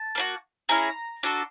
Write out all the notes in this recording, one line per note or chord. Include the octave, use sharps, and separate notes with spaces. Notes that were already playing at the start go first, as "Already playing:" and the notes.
Already playing: A5
A#3 D4 F#4
C#4 E4 G#4 A#5
D4 F#4 A4